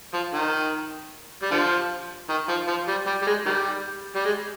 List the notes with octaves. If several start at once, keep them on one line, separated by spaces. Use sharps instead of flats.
F3
D#3
G3
D3 F3
D#3
F3
F3
G3
G3
G3
G#3
D#3 G3
G3
G#3